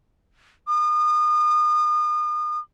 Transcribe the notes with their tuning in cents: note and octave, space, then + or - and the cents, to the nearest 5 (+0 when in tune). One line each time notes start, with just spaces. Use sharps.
D#6 -35